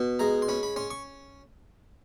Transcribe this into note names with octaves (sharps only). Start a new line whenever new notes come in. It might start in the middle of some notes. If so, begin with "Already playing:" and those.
Already playing: B2
G#3 A#5
C6
C#4 B5
B5
C#4 C6
C#6